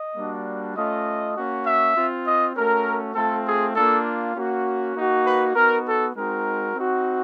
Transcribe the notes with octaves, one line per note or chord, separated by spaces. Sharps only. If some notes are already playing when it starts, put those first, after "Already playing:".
Already playing: D#5
G3 A#3 D4 F#4
A3 C#4 F4 D#5
A#3 C#4 F#4
E5
C4 F4
D#5
A3 C#4 F#4 A#4
A3 C4 F4 A4
G#4
A#3 D4 F4 A4
A#3 C#4 F#4
A#3 D#4 F#4
B4
B3 D#4 F#4 A#4
A4
G#3 C4 D#4 F#4 A#4
C4 D#4 F#4